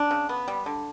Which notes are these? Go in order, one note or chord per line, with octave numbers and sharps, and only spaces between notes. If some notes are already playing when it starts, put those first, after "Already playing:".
Already playing: D4
C#3
B3
G3
D3